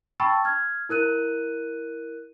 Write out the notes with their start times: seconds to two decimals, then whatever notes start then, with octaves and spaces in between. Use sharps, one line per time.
0.20 G5 A5 B5 C#6 E6 A6
0.45 F6 G#6
0.89 E4 A#4 F#6 D#7